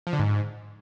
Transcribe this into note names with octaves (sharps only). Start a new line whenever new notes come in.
F3
D3
G#2